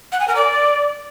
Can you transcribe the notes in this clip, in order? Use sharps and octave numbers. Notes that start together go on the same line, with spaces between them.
F#5
G#5
A#4
D5